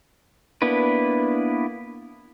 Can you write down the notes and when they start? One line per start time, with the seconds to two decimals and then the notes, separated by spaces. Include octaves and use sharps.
0.62 A#3 B3 D4 E4 B4